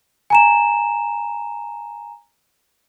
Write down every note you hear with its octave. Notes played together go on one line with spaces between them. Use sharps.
G#5 A#5 E7